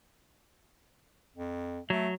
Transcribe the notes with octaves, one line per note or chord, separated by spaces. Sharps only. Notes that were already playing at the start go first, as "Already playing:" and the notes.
F2
F#3 A3